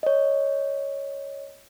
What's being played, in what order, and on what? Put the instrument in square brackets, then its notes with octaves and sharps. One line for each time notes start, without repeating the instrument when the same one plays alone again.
[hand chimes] C#5 D#5